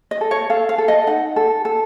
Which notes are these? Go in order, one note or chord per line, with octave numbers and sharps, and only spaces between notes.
D#5
A4
C#5
A4 F5
F5
A4
D#5
D#4 F#5
A4
A4